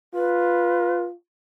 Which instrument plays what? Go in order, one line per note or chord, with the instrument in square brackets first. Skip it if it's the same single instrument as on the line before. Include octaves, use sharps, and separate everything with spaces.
[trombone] F4 [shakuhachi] B4